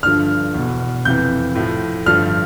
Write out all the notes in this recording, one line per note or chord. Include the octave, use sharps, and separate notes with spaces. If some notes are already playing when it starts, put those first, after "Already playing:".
G2 D3 F3 F6
E2 B2
F2 C3 E3 G6
A2 F3
G2 D3 F3 F6